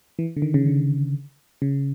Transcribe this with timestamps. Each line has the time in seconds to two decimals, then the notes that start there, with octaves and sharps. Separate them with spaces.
0.19 E3
0.37 D3
0.42 D#3
0.54 C#3
0.66 D3
1.62 C#3